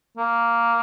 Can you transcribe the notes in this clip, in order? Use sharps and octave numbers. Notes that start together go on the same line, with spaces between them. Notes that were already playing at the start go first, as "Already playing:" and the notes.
A#3